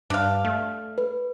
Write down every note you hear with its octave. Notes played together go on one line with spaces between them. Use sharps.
G2 D4 F5
A3
B4